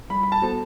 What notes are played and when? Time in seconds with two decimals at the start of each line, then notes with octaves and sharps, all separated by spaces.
0.10 G3 B5
0.23 B5
0.32 A5
0.42 B3 F#4 A4 C5